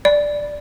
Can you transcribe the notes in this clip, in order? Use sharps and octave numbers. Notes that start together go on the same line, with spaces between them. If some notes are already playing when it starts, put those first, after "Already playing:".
D5